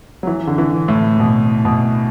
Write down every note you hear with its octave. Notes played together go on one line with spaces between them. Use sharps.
F#3
E3
D3
E3
A2
B2
B2